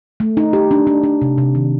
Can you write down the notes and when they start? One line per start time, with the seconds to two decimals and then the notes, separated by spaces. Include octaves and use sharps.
0.20 A3
0.37 D#4
0.53 G4
0.71 D4
0.87 D4
1.04 D4
1.22 C3
1.38 C3
1.55 D#3